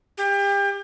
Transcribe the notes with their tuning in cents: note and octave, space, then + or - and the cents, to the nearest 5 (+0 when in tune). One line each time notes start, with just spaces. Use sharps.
G4 +30